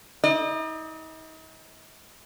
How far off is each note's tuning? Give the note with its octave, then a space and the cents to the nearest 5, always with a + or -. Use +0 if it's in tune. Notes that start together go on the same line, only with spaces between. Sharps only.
D#4 +40 D#5 -45